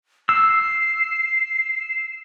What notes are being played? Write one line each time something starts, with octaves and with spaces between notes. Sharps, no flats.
E6 C7